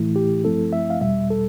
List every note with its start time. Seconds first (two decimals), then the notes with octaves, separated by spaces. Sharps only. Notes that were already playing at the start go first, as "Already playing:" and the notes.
Already playing: A2 E3 A3 E4
0.16 G4
0.44 G2 F3 A3 C4 E4 A4
0.73 E5
0.90 F5
1.01 E2 B2 G3 E5
1.30 A4